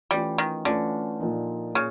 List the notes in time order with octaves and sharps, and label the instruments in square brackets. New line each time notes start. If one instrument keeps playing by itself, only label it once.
[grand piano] E3 A3 C#4 F4 [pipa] G3
[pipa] D#3
[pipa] D3 [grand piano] E3 A3 C#4 F4
[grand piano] A#2 F3 A#3 D#4
[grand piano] A#2 [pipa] C#3